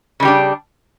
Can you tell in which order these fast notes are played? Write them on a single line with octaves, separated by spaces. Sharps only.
C#3 G3 G4 D4